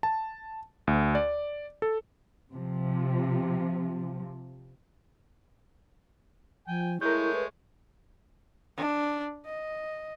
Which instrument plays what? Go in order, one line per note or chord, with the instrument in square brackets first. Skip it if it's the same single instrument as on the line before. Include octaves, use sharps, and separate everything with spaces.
[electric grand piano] A5
D2
D5
A4
[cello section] C3 F3
[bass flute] F3 [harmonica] G5 G#5
[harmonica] G#3 A3 C#5 [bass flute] E4 [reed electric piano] A#4 G6
[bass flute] B4
[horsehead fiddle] D4
D#5